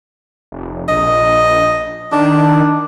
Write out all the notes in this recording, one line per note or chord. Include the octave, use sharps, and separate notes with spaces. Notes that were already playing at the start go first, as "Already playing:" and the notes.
F1
A#1 D#5
D#3 D4